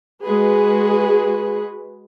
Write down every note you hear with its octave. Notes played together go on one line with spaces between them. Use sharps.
G#3 F#4 G#4 B4